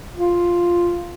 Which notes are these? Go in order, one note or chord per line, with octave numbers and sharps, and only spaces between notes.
F4